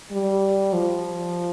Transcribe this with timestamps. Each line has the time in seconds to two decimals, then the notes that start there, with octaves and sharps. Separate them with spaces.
0.11 G3
0.73 F3